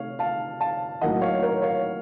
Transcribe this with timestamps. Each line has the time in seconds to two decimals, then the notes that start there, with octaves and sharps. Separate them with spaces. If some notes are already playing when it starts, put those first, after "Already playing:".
Already playing: C3 D#3 A3 C#5 F5
0.19 F5 A5
0.60 F5 A5
1.01 A2 F#3 A#3 D#4 D#5 F#5
1.21 C#5 F5
1.42 A#4 C#5
1.62 C#5 F5